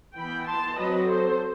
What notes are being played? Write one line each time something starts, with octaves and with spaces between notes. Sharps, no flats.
E3 B3 G5 B5
A5 C6
F#3 C4 B4 D#5
A4 C5